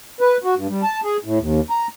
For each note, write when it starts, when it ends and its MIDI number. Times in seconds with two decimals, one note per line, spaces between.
0.21 0.37 71
0.44 0.55 66
0.56 0.68 43
0.69 0.82 55
0.83 1.00 81
1.04 1.17 68
1.24 1.38 45
1.39 1.60 39
1.70 1.87 82